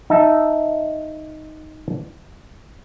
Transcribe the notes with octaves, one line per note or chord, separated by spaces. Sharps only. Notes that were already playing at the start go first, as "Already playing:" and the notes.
D#4 E5 A5